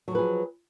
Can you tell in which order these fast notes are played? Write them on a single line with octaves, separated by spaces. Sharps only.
F#3 F3 B4 G#4